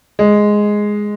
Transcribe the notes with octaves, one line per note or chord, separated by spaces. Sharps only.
G#3